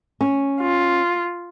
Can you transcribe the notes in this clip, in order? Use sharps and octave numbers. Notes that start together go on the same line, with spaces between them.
C#4
F4